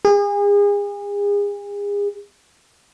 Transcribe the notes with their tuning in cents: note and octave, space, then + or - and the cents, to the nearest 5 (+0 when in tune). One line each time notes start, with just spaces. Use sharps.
G#4 -35